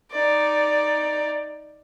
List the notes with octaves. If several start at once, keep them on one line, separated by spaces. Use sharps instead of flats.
D#4 D5